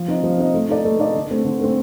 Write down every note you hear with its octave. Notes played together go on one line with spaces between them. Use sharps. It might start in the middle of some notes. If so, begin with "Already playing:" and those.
Already playing: F3
C4 D#4
F3
C4 D#4
A3
D#4 A4 D5
A3
D#4 A4 D5
D3
A3 C4
D3
A3 C4